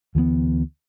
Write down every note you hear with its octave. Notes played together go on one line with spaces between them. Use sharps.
D2 E3 F3 B3